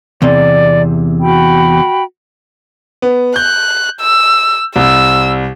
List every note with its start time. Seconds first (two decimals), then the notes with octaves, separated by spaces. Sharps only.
0.22 E2 C3 D5
1.21 F#4 G5 B5
3.02 B3
3.36 F#6 G6
4.00 E6
4.76 C2 E6